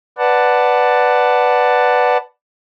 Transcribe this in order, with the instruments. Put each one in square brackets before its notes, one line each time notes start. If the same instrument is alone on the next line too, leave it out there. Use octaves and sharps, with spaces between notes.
[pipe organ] B4 D5 F#5 A5